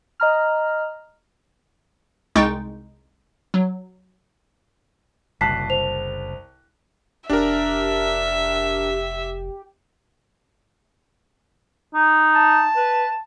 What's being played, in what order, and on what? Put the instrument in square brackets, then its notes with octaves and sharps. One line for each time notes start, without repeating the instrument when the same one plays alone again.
[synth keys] D#5 A#5 F6
[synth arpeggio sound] C2 G#3 D#4 G5 C#6 A6
F#3
[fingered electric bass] F#1 [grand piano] C2 A5 F#6 [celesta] B6 C7
[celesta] C5 F7
[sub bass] F1 [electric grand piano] D4 A#4 [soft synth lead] G4 [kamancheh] E5
[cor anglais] D#4
[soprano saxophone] A5
[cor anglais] B4